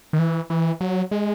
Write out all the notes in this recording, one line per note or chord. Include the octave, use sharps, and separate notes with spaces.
D#3
E3
E3
F#3
G#3